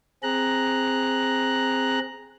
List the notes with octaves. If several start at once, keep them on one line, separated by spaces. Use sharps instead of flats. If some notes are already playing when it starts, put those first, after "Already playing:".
C4 G#4 A#5 F#6